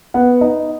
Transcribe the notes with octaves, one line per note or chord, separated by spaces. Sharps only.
B3 F#5
D#4 D#5